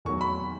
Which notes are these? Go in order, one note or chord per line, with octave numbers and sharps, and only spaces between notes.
E2 D#3 F#3 C#6
B5